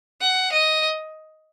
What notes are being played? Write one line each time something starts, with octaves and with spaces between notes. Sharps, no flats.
F#5
D#5